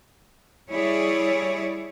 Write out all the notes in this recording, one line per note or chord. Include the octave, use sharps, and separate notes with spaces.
G3 E4 G#4 C#5 D5